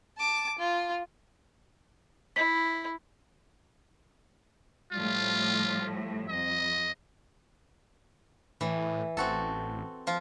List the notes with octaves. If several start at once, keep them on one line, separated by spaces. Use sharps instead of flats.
A5 D6
F4
E4 B6
A2 F3 G3 F4
F2 D#5
A2 E3
A1 C4 F#4 A4
F3 F4